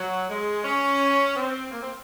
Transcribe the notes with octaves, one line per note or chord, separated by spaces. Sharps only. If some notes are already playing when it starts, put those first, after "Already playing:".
Already playing: F#3
G#3
C#4
C4
A#3
C4